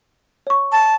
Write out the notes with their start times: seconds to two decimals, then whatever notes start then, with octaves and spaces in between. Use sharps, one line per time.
0.47 C#5 C#6
0.72 A5